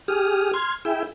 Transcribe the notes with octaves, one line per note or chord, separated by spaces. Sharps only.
G4 G#4 D#6 F6
C6 F6 G#6
E4 G#4 E5 G5